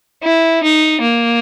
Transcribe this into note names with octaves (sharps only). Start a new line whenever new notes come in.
E4
D#4
A#3